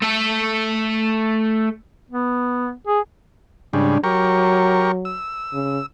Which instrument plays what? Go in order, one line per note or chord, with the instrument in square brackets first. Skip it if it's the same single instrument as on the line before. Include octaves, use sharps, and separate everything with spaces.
[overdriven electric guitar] A3 A4
[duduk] B3
G#4
[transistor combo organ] G#2 C#3 G3 [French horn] D4
[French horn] F#3 [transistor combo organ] G4 A#4 C#6
[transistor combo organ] E6
[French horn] C#3